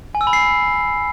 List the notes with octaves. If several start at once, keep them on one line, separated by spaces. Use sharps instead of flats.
G#5
E6
B5
C7
B5